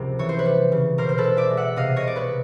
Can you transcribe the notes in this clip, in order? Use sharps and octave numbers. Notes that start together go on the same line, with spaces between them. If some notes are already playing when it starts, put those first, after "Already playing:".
Already playing: C#2 C3 F3 A#4
E3 C#5
C5
B4 C#5
G3
C#3
B2 A#4 C5
C5
A4 B4
G#3
D5 E5
G#3
E5 F#5
C3 D#5 F5
C#5 D#5
C2 D5
B4 C#5